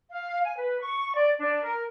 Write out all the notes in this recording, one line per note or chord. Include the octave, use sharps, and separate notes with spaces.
F5
G#5
B4
C#6
D5
D4
A#4